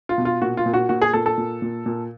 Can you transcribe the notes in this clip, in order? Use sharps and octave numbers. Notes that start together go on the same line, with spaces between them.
F4
B2
F4
A#2 F#4
F4
A#2
F#4
A#2 F#4
G#4
A#2 A4
A4
A#2
A#2
A#2